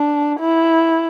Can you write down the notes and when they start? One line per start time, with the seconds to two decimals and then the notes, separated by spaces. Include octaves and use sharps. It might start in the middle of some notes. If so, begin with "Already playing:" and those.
Already playing: D4
0.40 E4